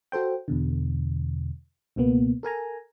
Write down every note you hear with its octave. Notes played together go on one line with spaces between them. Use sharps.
F#4 A4 C5 G5
E2 B2 D3
C#2 B2 A#3 B3
A4 A#4 G#5 A#5